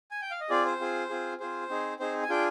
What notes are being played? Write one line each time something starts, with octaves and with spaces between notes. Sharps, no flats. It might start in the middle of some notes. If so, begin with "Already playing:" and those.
G#5
G5
F5
D#5
C4 F4 G#4 D5
C5
C4 F4 G#4
C4 F4 G#4
C4 F4 G#4 C5
C4 D#4 G#4
C4 D#4 G#4 C5
G#5
D4 F4 G#4 G5